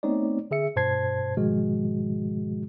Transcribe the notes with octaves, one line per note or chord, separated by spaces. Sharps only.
A3 B3 C4 D#4 C#5 D5
D3 G#4 E5 C#7
G2 B2 C5 A5 G#6 C7
G#2 B2 D#3 F3 G#3 F#4